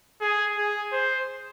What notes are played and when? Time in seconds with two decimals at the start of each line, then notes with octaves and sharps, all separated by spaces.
0.21 G#4
0.58 G#4
0.92 C5